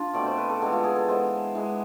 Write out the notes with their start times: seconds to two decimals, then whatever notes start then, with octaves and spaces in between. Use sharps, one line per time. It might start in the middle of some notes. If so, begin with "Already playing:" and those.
Already playing: D4 F4
0.13 B2 A3 C4 D5
0.26 C5
0.37 B4
0.50 A4
0.61 E3 G#3 B3 A4
0.73 F4
0.84 G#4
0.96 A4
1.08 E3 G#3 B3 C5
1.55 E3 G#3 B3